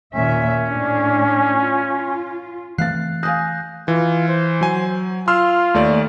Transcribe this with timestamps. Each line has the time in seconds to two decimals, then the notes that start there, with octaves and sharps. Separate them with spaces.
0.15 D#2 A#2 C#4 E5
0.67 A2 D4
1.58 F4
2.78 E3 A3 C4 F5 F#6 A6 C7
3.23 F5 G#5 D#6 F#6 G6 A#6
3.88 E3 F4
4.28 C5
4.61 F#3 G#5
5.28 F4 C6 E6 F6
5.74 D#2 A3 D5